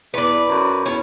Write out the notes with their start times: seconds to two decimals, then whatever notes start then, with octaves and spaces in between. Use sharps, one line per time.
0.14 E2 B4 D5
0.49 F#2
0.86 E2 C#4